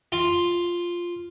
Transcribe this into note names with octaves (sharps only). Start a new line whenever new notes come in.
F4